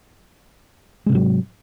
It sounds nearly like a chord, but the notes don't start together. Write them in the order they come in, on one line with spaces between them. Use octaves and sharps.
G#3 C3 G#2 F#3